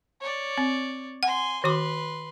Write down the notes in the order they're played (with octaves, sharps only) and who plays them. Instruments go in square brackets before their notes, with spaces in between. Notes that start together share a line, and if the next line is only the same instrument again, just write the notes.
[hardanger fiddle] C#5 D5
[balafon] C4
[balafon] F#5 [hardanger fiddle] G#5 C6
[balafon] D#3 F#4 D6 [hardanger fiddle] B4 C6